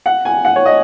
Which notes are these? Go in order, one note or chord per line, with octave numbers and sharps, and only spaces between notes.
F#5
G#5
F#5
C#5
D#5